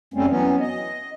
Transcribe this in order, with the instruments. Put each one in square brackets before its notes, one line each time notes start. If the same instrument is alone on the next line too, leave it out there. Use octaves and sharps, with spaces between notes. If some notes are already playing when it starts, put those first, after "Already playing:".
[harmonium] F#2 C#3 G3 A3 C4 C#4
E3 F#3 B3 C#4
D#5